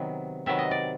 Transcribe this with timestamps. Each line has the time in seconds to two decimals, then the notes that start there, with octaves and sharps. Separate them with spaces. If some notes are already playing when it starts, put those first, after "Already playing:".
Already playing: C3 D#3 F#3 B3
0.46 C3 D#3 F#3 B3 E5
0.58 D#5
0.71 D5